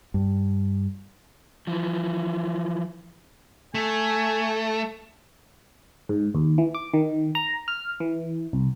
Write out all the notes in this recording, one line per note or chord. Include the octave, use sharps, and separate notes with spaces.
G2
E3 F3
A3 G#5
G#2
D#2
E3
D6
D#3
A#5
F6
E3
C2